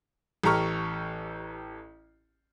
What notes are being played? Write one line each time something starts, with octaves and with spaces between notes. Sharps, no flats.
A1 G4 A4 A#5 C#6 F6